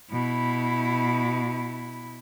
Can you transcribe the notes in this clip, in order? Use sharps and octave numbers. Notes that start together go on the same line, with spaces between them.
B2 E4